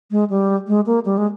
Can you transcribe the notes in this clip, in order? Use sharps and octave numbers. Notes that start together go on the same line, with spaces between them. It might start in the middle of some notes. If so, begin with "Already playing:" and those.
G#3
G3
G#3
A#3
G3
G#3